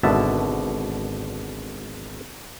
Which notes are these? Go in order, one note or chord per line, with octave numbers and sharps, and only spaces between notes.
G#1 B2 D3 E5 A5